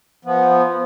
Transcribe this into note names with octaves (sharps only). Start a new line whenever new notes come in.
F3 B3